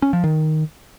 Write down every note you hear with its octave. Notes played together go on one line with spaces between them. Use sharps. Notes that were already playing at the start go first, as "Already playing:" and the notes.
C#4
F3
D#3